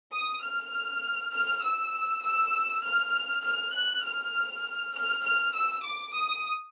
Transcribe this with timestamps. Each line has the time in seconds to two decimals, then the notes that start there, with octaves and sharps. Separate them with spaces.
0.13 D#6
0.43 F6
1.33 F6
1.63 E6
2.24 E6
2.84 F6
3.44 F6
3.74 F#6
4.04 F6
4.94 F6
5.24 F6
5.54 E6
5.84 D6
6.14 D#6